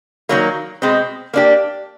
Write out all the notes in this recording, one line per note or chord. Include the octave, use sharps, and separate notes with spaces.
D#3 F#3 A#3
B2 G#3 C4
A#3 D4 G4